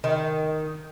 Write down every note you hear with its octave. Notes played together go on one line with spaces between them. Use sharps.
D#3